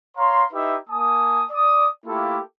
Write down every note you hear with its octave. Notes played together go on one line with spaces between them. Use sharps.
C#5 F5 A#5 C6
D#4 E4 G4 B4 E5
A#3 G#5 A5 D#6
D5 D#6
A3 A#3 E4 F4 G4 A4